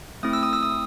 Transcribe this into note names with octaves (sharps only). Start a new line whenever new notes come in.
A3 C4 E4 D#6
E6
D#6
E6
D#6